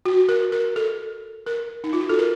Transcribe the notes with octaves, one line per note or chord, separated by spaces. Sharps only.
F#4
A#4
A#4
A4
A#4
D#4
F4
F#4
A4
A#4